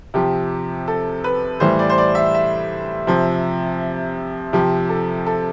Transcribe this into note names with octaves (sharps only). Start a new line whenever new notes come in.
C3 F3 G4
A4
B4
A2 E3 G3 C5
D5
C5
D5
E5
E5
C3 F3
C3 F3 G4
A4
A4